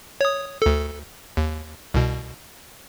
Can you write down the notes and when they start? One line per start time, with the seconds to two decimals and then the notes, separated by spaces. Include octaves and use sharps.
0.21 C#5 D#6
0.62 D2 A4
1.37 D#2
1.94 C2 B2